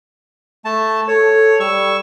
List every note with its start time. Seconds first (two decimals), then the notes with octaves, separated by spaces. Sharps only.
0.65 A3 A5
1.08 A4 C#5
1.60 G3 C#6 E6